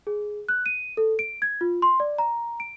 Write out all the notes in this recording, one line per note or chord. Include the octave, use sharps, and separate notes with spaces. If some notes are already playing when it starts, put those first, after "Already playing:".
G#4
F#6
D#7
A4
D7
G#6
F4
C6
D5
A#5
D7